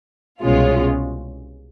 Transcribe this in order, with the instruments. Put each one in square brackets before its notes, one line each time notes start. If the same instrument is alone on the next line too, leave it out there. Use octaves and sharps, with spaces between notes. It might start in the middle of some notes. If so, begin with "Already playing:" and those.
[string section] C2 B2 G#3 C#4 F4